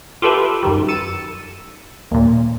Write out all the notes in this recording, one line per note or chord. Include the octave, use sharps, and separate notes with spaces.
F4 G4 A4 B4 E5
F#2 D#3 G3
E6 A6 C#7 D#7
D#2 A#2